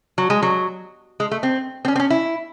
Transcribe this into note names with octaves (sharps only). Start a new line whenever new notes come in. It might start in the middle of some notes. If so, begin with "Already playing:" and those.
F#3
G#3
F#3
G#3
A3
C4
C4
C#4
C4
C#4
E4